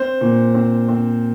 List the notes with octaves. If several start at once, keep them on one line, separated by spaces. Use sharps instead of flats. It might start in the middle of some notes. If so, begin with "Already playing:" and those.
Already playing: C4 C5
A#2
C4
C4